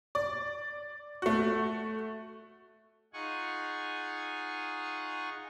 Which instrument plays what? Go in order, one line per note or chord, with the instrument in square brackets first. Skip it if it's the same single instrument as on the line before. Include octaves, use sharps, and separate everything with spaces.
[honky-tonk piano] D5
A3 F#4
[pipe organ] D#4 F4 G#4 F#5 G#5 C#6